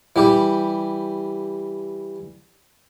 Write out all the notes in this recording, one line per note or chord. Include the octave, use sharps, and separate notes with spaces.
E3 G3 G4